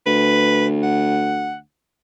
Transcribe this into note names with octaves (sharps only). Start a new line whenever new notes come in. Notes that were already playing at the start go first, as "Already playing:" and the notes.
D2 B4
F#5